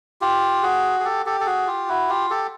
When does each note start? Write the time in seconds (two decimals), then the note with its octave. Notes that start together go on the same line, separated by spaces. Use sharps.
0.21 F4 G4
0.63 F#4 G#4
1.00 G#4
1.05 G4 A4
1.26 G4 A4
1.40 A4
1.46 F#4 G#4
1.67 F4 G4
1.89 E4 F#4
2.09 F4 G4
2.30 G4 A4